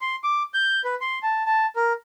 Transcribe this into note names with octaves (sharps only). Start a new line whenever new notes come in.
C6
D6
G6
B4
C6
A5
A5
A#4